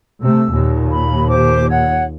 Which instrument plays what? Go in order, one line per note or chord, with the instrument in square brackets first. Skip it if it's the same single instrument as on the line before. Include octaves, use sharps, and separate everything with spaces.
[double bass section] C3 A3 [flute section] E6
[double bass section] D#2 A#2
[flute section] B5
G4 C5 D6
C#5 F#5